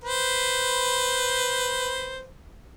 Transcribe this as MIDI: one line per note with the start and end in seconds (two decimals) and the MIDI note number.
0.04 2.26 71
0.04 2.26 72